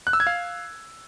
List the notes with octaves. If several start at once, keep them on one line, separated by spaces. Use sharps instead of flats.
F#6
E6
G#6
F5